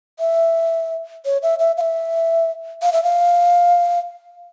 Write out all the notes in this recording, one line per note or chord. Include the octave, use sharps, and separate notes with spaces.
E5
C#5
E5
E5
F5
E5
F5
E5
F5